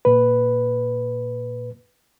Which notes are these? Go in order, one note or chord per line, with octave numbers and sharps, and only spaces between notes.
A#2 B4